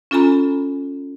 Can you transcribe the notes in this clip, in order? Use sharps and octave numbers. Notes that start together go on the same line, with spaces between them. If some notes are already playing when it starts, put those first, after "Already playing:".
C#4 F4 A4 G#5 A#5 B5